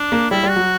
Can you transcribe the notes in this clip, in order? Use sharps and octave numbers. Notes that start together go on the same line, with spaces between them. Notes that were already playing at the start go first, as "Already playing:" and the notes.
Already playing: D4
A#3
G3 E4
G3
F#4
F#3